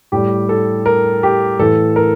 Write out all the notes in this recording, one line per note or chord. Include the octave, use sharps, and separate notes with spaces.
A2 G3 G4
A4
A#4
G4
A2 E3 A3 A4
A#4